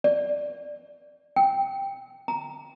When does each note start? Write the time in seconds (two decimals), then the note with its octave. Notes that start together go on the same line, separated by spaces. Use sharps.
0.04 D5
1.36 G5
2.28 A#5